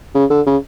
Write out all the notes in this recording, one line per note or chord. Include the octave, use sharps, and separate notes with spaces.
C#3
D3
C#3